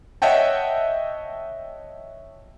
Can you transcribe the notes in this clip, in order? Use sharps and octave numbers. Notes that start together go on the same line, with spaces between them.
C#5 D#5 E5 F#5 G5 A5